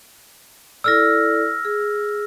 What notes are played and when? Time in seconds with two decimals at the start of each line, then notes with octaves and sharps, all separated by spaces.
0.84 E4 A4 D5 E6 F6 A#6
1.65 G#4